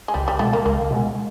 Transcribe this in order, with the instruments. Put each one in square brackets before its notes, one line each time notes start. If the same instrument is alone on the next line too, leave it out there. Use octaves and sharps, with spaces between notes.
[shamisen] G#3
[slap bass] C#2 [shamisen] G3
[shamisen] G3
[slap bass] B2 G#3 [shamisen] A3
[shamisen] A#3
[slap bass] C#2 [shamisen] A#3
[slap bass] B2 G#3